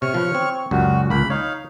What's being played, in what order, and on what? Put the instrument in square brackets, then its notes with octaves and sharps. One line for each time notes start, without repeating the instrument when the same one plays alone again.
[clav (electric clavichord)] C3 [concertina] C#5 C#6 F6
[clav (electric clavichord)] F3 B4
C4
[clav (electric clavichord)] C#2 F#2 G3 [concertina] F#4
[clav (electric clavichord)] C#2 A#3 [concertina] B5
[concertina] D#4 F5 [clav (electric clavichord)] C#5